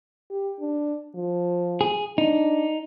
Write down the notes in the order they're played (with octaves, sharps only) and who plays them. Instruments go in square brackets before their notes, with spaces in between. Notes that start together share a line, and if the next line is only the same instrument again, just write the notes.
[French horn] G4
D4
F3
[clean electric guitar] G#4
[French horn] D4 [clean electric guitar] D#4